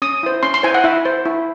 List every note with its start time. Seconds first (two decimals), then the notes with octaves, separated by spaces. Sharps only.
0.02 C#4 D#6
0.23 E4 C5
0.43 C#4 C6
0.54 C6
0.63 E4 C5 G#5
0.74 F#5
0.84 E4 E5
1.05 C5
1.25 E4